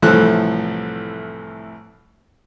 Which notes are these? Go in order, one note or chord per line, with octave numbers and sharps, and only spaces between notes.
C2 A2 E3 F3 A3 F#6